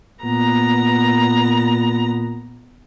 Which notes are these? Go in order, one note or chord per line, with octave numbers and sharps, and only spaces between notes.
A#2 B3 A#5